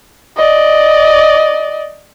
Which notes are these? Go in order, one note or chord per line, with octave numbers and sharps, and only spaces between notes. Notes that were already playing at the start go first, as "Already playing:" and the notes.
D5 D#5